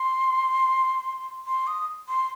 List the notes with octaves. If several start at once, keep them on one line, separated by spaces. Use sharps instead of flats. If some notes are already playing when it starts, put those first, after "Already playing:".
Already playing: C6
C6
D#6
C6